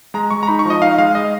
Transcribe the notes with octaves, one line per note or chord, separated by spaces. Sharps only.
G#3 A#5
G#3 C#6
A#5
D#4 B5
C#6
F3 D#5
D#4 F5
G#3 F5
D#5